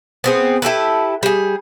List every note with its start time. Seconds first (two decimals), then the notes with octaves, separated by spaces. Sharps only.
0.24 B3 C4 G#4
0.62 E4 G4 A4 B4
1.23 G3 G#4